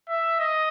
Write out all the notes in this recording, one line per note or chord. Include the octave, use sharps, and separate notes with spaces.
E5
D#5